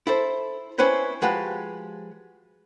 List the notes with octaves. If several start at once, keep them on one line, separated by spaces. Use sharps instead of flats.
E4 A4 C5
C4 C#4 E4 B4 C5
F3 G#3 F#4 G4 B4